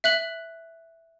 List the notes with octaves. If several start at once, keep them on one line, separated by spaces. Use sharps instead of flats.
E5 F#6 F#7